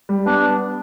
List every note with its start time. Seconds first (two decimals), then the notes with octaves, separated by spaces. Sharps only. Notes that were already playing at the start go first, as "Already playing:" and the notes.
0.09 G3
0.26 B3 D4